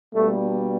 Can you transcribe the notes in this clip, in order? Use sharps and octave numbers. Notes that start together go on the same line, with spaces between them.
B2 G3 A3 A#3 D4